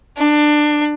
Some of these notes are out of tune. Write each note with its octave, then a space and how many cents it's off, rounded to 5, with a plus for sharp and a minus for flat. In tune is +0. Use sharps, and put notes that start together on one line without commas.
D4 +20